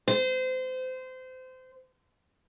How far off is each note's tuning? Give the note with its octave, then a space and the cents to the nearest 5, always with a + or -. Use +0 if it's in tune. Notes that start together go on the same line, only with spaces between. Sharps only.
C5 -25